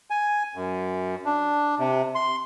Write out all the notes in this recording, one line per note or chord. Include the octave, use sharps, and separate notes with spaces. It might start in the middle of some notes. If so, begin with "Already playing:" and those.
G#5
F#2
D4
C3
C6